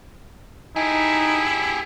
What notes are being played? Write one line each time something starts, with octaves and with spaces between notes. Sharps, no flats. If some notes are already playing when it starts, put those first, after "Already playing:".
D#4 E4 G4 G#4